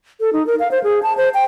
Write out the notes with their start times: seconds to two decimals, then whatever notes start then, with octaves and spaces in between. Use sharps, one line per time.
0.20 A4
0.33 D#4
0.47 A#4
0.60 F5
0.71 C5
0.84 G#4
1.03 A5
1.17 C5
1.34 G5